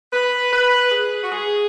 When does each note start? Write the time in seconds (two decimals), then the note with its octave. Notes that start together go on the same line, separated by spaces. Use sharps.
0.12 B4
0.51 B4
0.91 G#4
1.22 F#4
1.31 G#4